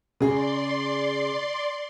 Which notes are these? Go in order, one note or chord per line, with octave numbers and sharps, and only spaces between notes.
C#3 G#4 D5 C6